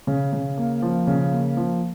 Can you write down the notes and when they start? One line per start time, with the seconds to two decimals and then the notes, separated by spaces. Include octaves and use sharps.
0.07 C#3
0.33 C#3
0.58 A#3
0.82 F3
1.07 C#3
1.32 A#3
1.57 F3